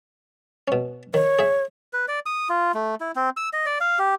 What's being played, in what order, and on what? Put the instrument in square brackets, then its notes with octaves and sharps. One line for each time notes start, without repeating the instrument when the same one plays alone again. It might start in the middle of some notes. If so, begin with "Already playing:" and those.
[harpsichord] B2 C#4
[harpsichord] D#3 [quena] C#5
[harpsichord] G#4 E5
[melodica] B4
D5
D#6
F4
A3
E4
C4
E6
D#5
D5
F5
G4